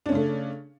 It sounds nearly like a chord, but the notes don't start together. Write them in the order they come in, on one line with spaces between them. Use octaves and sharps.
D4 C#4 C#3 A3